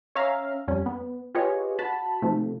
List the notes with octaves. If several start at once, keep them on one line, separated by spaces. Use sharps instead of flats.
C#4 C#5 E5 F5 A#5
F2 G3 C#4
B3
F4 G4 G#4 B4 C#5 D#5
F#4 A5 B5
C3 D#3 F3 A3